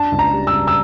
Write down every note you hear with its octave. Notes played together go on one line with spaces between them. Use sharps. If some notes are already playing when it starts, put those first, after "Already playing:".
Already playing: D4 A5
C#2
A#5
G3
E6
C#3
E6